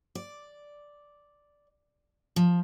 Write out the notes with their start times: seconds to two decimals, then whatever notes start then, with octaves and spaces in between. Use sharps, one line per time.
0.15 D5
2.36 F3